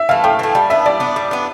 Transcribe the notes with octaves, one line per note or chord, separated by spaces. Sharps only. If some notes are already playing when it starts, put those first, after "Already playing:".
Already playing: E5
E3 A3 F5
A2 G5
E3 A3
G3
B3 D4 E5
G3 D5
B3 D4
G3
B3 D4